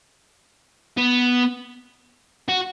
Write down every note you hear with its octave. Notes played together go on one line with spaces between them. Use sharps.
B3
F#4